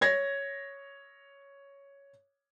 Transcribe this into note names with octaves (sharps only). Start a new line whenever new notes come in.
C#5 G#6 A#6